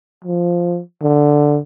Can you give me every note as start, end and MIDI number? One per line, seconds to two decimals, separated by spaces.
0.24 0.80 53
1.03 1.59 50